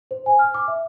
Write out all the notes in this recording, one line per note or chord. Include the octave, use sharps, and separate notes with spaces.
C5
G#5
F6
D6
E5